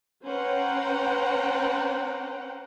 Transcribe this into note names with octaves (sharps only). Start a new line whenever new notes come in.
C#4 B4 C5 F#5 G5 A#5